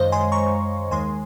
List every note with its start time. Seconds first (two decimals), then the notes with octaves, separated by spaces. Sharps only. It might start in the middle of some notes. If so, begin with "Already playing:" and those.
Already playing: F#2 D#3 G#3 C5 C#5 D#5 F5
0.12 G#5 C6
0.32 A#5 C#6
0.91 D#2 D#3 G#3 G#5 C6